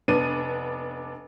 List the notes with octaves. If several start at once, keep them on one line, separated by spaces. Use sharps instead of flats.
F1 B3 D4 D#7